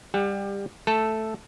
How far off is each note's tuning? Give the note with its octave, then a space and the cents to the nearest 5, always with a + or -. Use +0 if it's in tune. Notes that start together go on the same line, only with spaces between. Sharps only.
G3 +20 G4 +30 F#5 +5
A3 +0 A4 +0